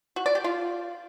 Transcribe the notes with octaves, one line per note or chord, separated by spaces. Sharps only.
F#4
D5
G4
F4